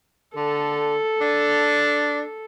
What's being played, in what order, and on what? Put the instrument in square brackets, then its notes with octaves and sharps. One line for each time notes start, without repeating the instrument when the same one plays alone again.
[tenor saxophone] D3 [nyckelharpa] A4
[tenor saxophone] D4